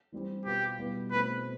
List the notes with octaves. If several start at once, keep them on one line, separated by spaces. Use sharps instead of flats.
E3 G3 C4 G4
B2 B3 F4 G4
B2 G3 B3 E4 B4
B2 A3 C4 B4